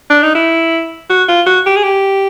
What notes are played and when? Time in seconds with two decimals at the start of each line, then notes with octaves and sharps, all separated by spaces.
0.10 D4
0.23 D#4
0.35 E4
1.10 F#4
1.28 F4
1.46 F#4
1.66 G4
1.76 G#4
1.83 G4